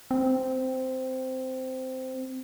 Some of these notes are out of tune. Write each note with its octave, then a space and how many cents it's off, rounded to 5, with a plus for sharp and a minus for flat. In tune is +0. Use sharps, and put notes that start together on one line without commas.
C4 -10